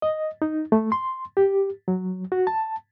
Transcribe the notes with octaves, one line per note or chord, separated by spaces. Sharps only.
D#5
D#4
A3
C6
G4
F#3
F#4
A5